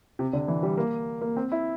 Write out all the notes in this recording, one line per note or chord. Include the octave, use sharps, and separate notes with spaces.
C3
D3
E3
G3
A#3
A#3
C4
E4